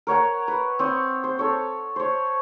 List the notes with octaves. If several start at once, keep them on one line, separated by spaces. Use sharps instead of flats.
A#4 C#5 F#5 A#5
B4
C4 C#5 D#6
C5
A4 C#5
C5 C#5